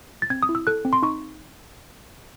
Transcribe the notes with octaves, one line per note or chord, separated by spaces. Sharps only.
A6
C4 G#6
D#6
E4
E6
A4 F#6
C4
C6
D#4 C#6